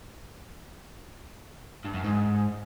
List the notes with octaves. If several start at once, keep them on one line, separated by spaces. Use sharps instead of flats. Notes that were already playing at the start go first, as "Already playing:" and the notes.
G2
F#2
G#2